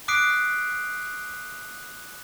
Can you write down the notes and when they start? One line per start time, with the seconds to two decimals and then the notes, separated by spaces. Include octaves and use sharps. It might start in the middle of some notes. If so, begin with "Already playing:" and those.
0.08 D6 D#6 F#6 B6 C7 D7